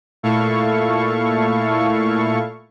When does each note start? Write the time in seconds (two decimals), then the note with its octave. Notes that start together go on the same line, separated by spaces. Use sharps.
0.23 A#2 A3 E4 A4 F5 C#6